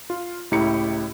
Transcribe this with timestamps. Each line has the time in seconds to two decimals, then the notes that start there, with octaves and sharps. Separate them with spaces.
0.10 F4
0.51 C#2 A2 E4 G4 A#5 C#7